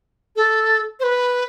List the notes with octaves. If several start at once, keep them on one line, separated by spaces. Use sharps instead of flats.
A4
C5
B4